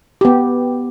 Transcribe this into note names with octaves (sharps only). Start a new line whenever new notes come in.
B3 G4